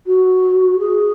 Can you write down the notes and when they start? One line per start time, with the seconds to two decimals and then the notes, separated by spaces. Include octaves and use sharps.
0.06 F#4
0.79 G#4